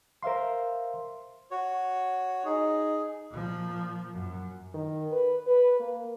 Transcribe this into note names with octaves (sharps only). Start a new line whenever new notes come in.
A#4 C5 E5 F5 C6
F#4 C#5
D#4 G#4
A#2 F3
F#2
D#3
B4
B4
A#3